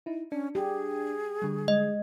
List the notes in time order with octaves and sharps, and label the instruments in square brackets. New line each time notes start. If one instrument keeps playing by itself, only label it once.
[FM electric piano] D#4 E4
[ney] C#4 [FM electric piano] D4
[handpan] G4 [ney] G#4
[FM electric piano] D3 G3
[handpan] G#3 [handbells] D#5